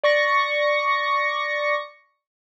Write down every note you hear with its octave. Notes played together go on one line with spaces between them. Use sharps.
D5 C#6 A#6 C#7